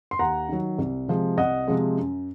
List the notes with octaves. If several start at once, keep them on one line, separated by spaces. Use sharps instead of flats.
C6
D#2 F#5 A#5
D#3 F#3
C2
C3 F3 G#3
C2 D#5 F#5
C3 F3 G#3
F#2